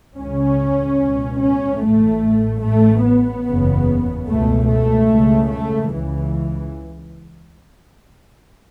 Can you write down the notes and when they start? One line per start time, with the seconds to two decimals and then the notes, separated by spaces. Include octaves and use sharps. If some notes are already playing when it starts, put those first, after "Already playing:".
0.18 C#2 C#3 C#4
1.00 C#2 B2
1.41 C#4
1.82 A1 A2 A3
2.64 A1 A2 A3
3.05 B3
3.46 F#1 E2 C#3
4.28 C#2 B2 A3
4.69 A3
5.10 C#2 C#3
5.50 A3
5.92 C#2 C#3 E3